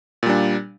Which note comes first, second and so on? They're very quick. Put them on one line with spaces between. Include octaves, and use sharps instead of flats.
A#2 G3 D4